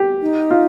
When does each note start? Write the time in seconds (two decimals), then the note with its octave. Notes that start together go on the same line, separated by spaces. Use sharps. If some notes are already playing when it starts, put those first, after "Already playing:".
Already playing: G4
0.22 D#4
0.51 F4